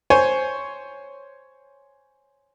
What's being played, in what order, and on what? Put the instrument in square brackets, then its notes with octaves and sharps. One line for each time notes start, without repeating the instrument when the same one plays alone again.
[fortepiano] C5 C#5 G#5